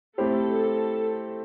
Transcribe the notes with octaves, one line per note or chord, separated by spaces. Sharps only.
A3 C4 E4 G4 A4 C5